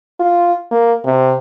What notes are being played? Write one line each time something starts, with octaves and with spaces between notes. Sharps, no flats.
F4
A#3
C3